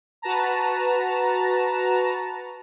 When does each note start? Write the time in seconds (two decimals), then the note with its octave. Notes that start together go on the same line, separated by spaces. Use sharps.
0.22 F#4 B4 A5 A#5